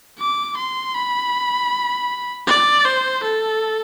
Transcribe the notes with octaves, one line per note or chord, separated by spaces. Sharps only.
D6
C6
B5
D5
C5
A4